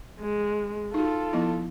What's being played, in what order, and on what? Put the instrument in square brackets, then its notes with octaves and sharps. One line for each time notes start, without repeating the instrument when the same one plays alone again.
[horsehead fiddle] G#3
[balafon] D#4 F#4 [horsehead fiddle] F4 A4
[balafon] F3 B3 E4